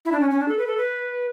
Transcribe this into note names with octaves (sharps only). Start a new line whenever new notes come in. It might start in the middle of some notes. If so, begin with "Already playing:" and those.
E4
D4
C#4
C#4
D4
A4
B4
A4
B4